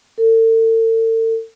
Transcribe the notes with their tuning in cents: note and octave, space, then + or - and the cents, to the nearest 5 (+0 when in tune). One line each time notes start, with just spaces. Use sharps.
A4 +40